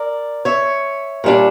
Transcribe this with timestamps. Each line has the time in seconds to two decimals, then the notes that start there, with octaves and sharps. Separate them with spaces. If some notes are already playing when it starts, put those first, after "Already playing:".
Already playing: A#4 D5
0.45 C#5 E5
1.24 A#2 G3 D4